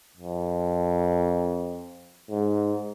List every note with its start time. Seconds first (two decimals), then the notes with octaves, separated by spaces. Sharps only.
0.17 F2
2.30 G#2